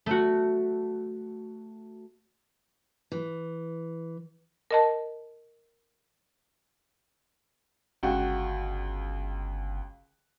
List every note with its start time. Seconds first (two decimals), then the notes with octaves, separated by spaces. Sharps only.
0.06 A3 F#4
3.12 E3
4.71 A#4 D#5 A5
8.03 G1 C#2 F#4 G5